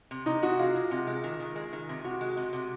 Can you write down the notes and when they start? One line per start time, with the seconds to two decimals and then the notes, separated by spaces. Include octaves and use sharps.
0.11 C3
0.26 C3 D#4
0.43 C3 F#4
0.59 G#3 F4
0.75 G#3
0.91 C3
1.07 G#3
1.24 D#3
1.39 D#3
1.56 G#3
1.73 D#3
1.89 C3
2.04 C3 F#4
2.21 G#3
2.37 C3
2.53 C3